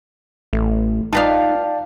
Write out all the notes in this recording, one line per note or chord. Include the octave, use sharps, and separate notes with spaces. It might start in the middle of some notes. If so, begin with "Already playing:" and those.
A1 A3
D#4 F4 B4 D5 F5 G5 A5